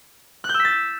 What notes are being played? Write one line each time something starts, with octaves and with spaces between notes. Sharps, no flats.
F#6
G6
E6
B6
A6